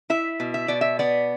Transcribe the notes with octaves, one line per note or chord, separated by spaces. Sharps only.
E4 E5
B2
E5
B2 D5
E5
B3 D5